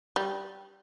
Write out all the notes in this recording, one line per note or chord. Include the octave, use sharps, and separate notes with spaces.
G3